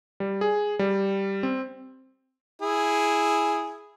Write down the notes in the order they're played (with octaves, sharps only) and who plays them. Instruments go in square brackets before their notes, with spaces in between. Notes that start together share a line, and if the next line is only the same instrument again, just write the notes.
[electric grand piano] G3
G#4
G3
C4
[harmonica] E4 G#4